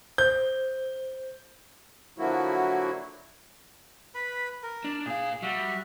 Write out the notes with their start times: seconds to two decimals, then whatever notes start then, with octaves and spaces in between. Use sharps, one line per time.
0.18 C5 G6
2.18 D3 F3 F#3 A#3 E4 F#4
4.15 B4 B5
4.63 A#4
4.84 D4
5.06 A#2 G#4 F5
5.43 G3 F#4 E5